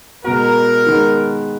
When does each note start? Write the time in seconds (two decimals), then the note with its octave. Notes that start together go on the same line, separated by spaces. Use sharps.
0.24 B2 G#3 B3 F#4 A#4
0.86 D#3 G#3 B3